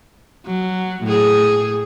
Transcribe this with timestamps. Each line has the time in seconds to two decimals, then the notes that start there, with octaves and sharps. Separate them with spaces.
0.46 F#3
1.04 A2 G#4